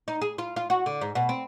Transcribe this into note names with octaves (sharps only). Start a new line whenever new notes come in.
D#4
G#4
F4
F4
F#4
D3
G#2
B2
C4